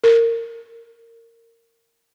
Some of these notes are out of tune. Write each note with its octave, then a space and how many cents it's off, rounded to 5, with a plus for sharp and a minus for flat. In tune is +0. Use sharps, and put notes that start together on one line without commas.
A#4 -20